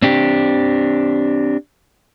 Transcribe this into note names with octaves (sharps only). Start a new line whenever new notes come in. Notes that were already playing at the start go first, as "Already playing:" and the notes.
C4 D4 G4